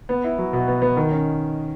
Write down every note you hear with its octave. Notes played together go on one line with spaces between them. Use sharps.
B3
E4
F#3
B2
B3
B3
D#3
C#4